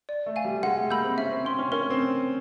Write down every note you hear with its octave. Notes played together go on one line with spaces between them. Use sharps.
D5
A3
F5 G#5
G3
G#3 F#5
A3
A#3 B5 E6 G6
C4
C#4 E5
C4
C#4 G5 C6
C#4
C#4 A#4
C4